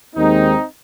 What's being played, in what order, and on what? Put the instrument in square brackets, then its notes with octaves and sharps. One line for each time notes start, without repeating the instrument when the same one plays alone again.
[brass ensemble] D#2 D#3 G#3 C4 D#4